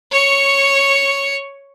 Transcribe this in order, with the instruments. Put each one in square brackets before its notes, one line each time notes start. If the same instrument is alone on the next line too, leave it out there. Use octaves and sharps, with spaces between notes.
[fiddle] C#5 C#6